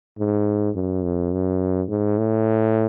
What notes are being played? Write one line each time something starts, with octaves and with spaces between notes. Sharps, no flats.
G#2
F#2
F2
F#2
G#2
A2